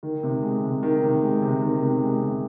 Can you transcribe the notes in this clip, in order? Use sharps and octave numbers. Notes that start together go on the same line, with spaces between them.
D#3
C3
G#3
C3
D#3
C3
G#3
C3
D#3
C3
G#3
C3